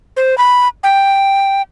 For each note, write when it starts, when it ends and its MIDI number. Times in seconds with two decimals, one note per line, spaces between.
0.17 0.37 72
0.38 0.68 83
0.83 1.62 79